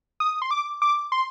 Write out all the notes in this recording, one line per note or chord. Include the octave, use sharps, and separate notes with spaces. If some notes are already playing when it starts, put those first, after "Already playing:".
D#6
C6
D6
D6
C6